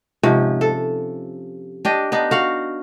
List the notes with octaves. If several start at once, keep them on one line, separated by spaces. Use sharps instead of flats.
G#2 C3 F3 C#4
A4
D4 G4 D#5
B3 D4 D#4
F#4 F5 F#5